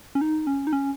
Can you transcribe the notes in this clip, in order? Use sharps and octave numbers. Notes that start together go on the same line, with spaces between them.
C#4
D#4
C#4
D#4
C#4